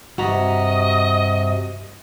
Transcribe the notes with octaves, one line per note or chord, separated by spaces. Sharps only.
G2 C3 F#4 D#5 A#5